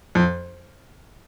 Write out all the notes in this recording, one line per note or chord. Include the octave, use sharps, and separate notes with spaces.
F2